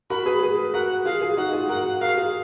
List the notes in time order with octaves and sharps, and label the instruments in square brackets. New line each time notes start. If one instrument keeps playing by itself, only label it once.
[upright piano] F#4 A#4 [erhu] B5
[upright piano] G#4 B4
G#4 B4
[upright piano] F#4 A#4 [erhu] F#5
[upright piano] F4 G#4 [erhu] F5
[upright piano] F4 G#4
[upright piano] D#4 F#4 [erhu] F#5
[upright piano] F4 G#4
[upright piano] F#4 A#4 [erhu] F#5
[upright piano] F#4 A#4 [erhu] F5
[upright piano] F4 G#4